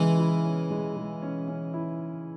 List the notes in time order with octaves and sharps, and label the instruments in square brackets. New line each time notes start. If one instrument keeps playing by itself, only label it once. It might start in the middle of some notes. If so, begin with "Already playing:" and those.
Already playing: [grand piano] C#3 G#3 E4 [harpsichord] E3
[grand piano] E4
C#4
G#3
G#3
C#4
C#4
E4